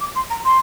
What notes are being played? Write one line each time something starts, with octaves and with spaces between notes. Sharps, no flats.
D6
C6
A#5
C6